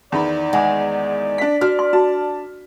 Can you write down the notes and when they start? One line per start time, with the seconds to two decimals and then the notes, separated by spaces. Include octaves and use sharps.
0.12 E2 D#3 D5 B5 C6
0.53 G#3 F#5 G#5 D6
1.38 D4 B6
1.61 D4 F#4 F6
1.79 C6
1.93 F#4 A5